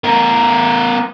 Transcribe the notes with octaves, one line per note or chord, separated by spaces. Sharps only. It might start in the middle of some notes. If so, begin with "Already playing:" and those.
B3 A#4